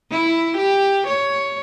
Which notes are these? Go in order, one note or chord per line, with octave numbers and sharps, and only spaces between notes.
E4
G4
C#5